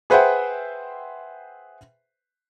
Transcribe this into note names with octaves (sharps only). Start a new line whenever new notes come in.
G#4 B4 C5 E5 F#5 G5